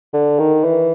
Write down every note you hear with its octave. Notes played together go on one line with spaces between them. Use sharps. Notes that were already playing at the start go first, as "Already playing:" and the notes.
D3
D#3
E3